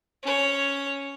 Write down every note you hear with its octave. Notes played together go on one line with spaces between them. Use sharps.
C#4 C#5